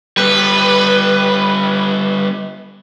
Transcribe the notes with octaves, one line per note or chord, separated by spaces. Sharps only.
G3 B3 B4